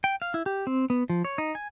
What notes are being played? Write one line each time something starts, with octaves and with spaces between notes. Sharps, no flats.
G5
F5
E4
G4
C4
B3
F3
C#5
D#4
G#5